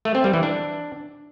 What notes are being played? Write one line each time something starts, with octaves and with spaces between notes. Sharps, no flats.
A3
C4
G3
E3
D4